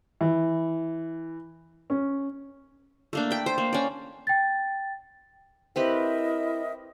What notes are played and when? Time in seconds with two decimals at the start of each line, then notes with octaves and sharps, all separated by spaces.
0.21 E3
1.90 C#4
3.13 A3 A#3 D4
3.31 G5 B5
3.46 C5
3.58 A#3
3.73 C#4 D5
4.27 G5 A6
5.76 C4 E4 G4 A#4 B4 D#5 E5